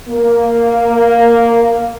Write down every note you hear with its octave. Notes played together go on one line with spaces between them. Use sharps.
A#3